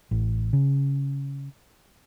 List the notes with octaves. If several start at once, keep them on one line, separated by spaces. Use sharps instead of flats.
A1
C#3